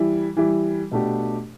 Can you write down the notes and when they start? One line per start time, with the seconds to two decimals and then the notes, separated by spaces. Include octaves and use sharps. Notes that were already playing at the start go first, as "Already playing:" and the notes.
Already playing: E3 G3 E4
0.37 E3 G3 E4
0.91 B2 A3 D4 G4